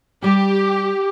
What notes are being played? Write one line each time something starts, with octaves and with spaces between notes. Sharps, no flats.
G3 G4 G5